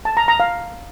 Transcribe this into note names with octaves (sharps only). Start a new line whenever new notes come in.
A5
A#5
A#5
F5